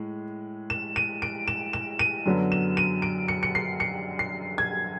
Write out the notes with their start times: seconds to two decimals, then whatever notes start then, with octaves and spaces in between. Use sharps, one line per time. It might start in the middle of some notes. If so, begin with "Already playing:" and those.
Already playing: A2 G#3
0.70 E7
0.96 D#7
1.22 D7
1.48 E7
1.73 E7
1.99 D#7
2.26 F#2 D3 F#3 B3
2.52 E7
2.77 D#7
3.02 D7
3.28 C#7
3.43 C#7
3.55 C7
3.80 C#7
4.19 C7
4.58 G#6